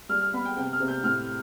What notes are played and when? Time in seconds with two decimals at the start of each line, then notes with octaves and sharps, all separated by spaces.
0.09 G3 F6
0.21 F6
0.33 B3 B5
0.45 G5
0.57 C3 G5
0.73 F6
0.80 C3
0.88 G6
1.04 A2 F6